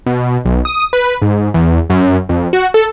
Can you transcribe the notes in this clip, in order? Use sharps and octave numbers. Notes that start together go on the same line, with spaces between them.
B2
B1
D#6
B4
G#2
E2
F#2
F2
F#4
A4